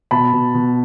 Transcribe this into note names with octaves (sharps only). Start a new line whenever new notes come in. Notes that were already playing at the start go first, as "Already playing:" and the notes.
B2 A5 B5
B2
B2